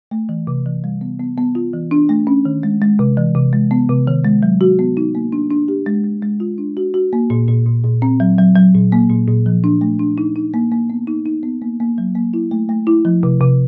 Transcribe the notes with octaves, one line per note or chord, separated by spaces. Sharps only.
A3
E3
C3
E3
G3
B3
B3
B3
F4
E3
D4
A3
C#4
D#3
G#3
G#3
C3
E3
C3
G#3
B3
C3
D#3
G#3
F#3
F#4
B3
D#4
A#3
D4
D4
G4
G#3
G#3
G#3
F4
D4
F#4
F#4
A#3
A#2
A#2
A#2
A#2
C4
F#3
F#3
F#3
A#2
A#3
A#2
A#2
F3
D4
A3
D4
D#4
D#4
A#3
A#3
B3
D#4
D#4
B3
A#3
A#3
F#3
A#3
E4
A3
A3
E4
F3
C3
C3